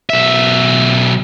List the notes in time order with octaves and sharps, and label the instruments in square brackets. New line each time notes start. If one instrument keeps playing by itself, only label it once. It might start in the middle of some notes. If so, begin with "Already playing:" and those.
[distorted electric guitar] B1 E5